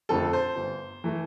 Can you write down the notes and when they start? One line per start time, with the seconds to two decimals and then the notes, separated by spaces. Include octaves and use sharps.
0.09 F2 D3 A3 A4
0.33 C5
0.56 G1
1.04 E3 A3